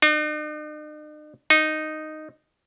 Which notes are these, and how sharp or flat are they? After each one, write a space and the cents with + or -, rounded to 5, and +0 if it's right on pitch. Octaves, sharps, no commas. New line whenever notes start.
D#4 -45
D#4 -5